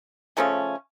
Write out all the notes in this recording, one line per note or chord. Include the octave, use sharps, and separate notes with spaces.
C#3 F3 A3 C#4